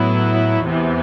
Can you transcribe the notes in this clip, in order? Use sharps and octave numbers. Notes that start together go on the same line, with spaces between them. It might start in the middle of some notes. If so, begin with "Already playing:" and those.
Already playing: A2 F#3 B3 E4
E2 C3 E3 B3